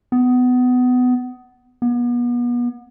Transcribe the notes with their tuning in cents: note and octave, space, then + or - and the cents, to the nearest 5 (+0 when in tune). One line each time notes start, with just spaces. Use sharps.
B3 +20
B3 -35